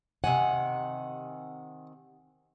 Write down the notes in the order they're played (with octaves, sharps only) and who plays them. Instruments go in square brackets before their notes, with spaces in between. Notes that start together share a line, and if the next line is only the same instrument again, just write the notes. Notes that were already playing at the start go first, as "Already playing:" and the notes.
[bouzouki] C3 D#3 G#5 [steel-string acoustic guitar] F#5